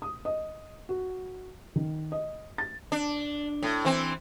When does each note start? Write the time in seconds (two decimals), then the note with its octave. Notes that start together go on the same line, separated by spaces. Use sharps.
0.02 D#6
0.25 D#5
0.89 F#4
1.76 D#3
2.12 D#5
2.58 A6
2.92 D4
3.63 A2
3.85 E3 C4